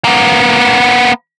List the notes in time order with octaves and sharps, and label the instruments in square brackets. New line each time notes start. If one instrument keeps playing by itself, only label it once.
[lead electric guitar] A#3 B3